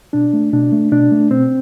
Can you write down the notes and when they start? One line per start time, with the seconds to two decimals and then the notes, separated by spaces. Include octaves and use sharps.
0.13 B2 D4
0.33 A3
0.53 B2 D4
0.72 A3
0.92 B2 D4
1.12 A3
1.30 B2 C4